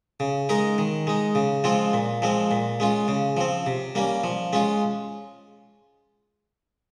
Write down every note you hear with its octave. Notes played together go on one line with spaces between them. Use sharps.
C#3
G#3 D#4 A#4
D#3
G#3 D#4
C#3
F3 G#3 C4 F4
A#2
F3 G#3 C4
A#2
G#3 C#4 F4
C#3
F3 C4
C3
G3 A#3 C#4
F3
G#3 C#4 F4